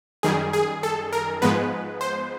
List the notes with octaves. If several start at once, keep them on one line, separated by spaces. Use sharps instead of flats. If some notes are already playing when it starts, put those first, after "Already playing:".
F#2 D#3 G3 G#4
G#4
A4
A#4
G#2 F3 G#3 B3 B4
C5